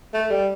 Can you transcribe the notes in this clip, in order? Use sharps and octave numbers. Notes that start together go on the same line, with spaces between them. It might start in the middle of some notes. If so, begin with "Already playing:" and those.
A3
G3